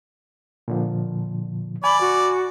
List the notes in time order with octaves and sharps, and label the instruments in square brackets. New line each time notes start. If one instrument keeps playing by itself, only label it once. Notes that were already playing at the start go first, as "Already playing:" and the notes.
[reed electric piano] A#2 D3 F3
[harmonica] D5 [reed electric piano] G#5 [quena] B5
[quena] F#4